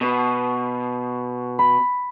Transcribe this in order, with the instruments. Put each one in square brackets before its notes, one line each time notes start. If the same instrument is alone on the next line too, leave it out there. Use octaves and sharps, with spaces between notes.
[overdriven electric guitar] B2
[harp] B5